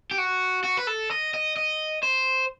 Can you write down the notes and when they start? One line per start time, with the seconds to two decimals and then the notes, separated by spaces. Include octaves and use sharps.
0.11 G4
0.18 F#4
0.64 F#4
0.77 B4
0.87 A4
1.11 D#5
1.34 D#5
1.56 D#5
2.03 C5